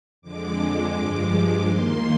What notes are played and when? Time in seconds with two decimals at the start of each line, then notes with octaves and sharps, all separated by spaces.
0.22 F2 D3 G#3 D6
0.93 G2 F3 G#3
1.66 D#2 D#3 A#3 C6